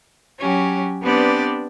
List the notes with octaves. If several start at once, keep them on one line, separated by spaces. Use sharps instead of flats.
F#3 C#4 G4
B3 C4 D4 G4 B4 D5